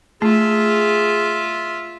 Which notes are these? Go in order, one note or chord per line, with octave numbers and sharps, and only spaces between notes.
A3 F4 G#4 E5